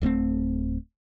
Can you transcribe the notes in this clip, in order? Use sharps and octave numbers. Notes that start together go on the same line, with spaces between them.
D1 G2 A3 C4